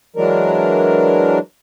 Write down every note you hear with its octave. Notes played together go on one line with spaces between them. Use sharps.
E3 F#3 G#3 D4 A#4